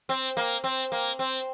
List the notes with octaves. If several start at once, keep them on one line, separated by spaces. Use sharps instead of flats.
C4
A#3
C4
A#3
C4